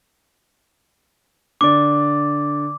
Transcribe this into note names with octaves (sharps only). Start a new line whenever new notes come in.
D3 D5 D6